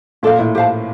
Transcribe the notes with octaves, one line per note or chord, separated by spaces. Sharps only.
A#2 D4 A4 D5 F5
A2
G4 C5 F5 A5